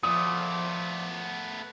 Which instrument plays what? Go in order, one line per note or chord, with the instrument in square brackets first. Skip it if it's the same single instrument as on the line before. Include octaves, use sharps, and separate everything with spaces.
[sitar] A#2 [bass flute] F3 [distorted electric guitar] A3 B3 [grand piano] D#6